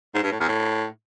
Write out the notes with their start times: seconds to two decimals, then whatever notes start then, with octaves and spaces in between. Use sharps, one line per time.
0.14 G#2
0.23 G2
0.31 A2
0.40 E2
0.48 A2